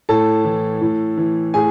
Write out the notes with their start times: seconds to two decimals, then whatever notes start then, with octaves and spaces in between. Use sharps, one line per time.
0.09 A2 A4 A5
0.45 E3
0.81 A2
1.17 E3
1.54 A2 G#4 G#5